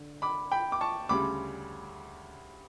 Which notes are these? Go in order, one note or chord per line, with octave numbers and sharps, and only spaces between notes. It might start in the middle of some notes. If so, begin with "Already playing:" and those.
Already playing: D3
B5 D6
G5 B5
D6
A5 C#6
D2 C#3 G3 B5 D6